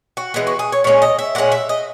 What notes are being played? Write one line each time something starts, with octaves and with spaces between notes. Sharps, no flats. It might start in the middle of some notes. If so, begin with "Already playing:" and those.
F#4
E3 G#3 B3
F#4
G#4
C#5
A#2 G#3 C#4 C#5
D#5
E5
A#2 G#3 C#4 F#5
E5
D#5